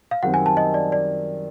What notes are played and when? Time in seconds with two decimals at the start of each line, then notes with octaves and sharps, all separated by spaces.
0.11 F5
0.23 F#2 D#3 G3 C4 F#5
0.34 G#5
0.46 A5
0.57 D#5
0.74 D5
0.92 D5